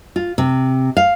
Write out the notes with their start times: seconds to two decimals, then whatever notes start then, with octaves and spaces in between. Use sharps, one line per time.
0.16 F4
0.38 C3
0.97 F5